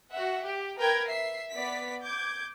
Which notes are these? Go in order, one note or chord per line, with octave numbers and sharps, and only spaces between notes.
F#4 E5 F#5
G4
A#4 B4 G5 G#6
E5 C7
B3 D5 B6
D6 G6 G#6